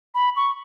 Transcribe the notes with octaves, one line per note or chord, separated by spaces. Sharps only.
B5
C#6